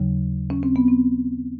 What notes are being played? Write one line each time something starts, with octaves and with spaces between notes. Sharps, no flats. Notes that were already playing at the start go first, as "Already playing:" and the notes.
Already playing: D#2 C#3 F#3
C#4
C4
B3
C4